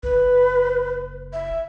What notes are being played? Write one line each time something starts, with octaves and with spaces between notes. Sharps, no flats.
F#1 B4
E5